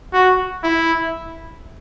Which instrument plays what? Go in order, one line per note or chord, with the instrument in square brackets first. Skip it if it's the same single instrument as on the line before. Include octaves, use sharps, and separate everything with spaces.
[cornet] F#4
E4